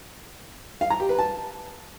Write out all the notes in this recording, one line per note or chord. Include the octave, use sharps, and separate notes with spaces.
F5
A#5
G4
B4
A5